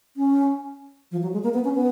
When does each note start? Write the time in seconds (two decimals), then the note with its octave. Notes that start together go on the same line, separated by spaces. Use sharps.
0.17 C#4
1.11 F3
1.22 F#3
1.33 G#3
1.44 A#3
1.54 B3
1.64 C#4
1.75 B3